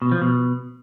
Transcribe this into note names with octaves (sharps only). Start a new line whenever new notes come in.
B2
F3
B2